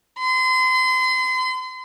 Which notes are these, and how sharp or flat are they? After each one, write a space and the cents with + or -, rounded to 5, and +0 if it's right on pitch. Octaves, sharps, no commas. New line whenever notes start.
C6 -35